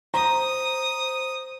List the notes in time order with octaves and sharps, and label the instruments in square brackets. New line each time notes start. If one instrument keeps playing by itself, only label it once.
[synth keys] C5 [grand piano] A#5 [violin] D#6